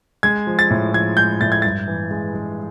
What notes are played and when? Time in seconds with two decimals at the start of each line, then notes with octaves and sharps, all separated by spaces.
0.23 G#3 G#6
0.47 F3
0.59 A6
0.70 A2
0.93 F3 G#6
1.17 G#3 G6
1.41 A2 A6
1.52 G#6
1.62 G2 A6
1.88 E3
2.11 G#3
2.34 G#3